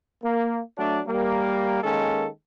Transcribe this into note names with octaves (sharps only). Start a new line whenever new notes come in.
A#3
F#3 A3 D4
G3 A#3
D#3 G#3 A#3 C#4 A4